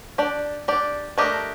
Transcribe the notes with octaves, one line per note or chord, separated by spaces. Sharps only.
D4 G4 D5
D4 G4 D5
A3 D4 G4 A#4 D#5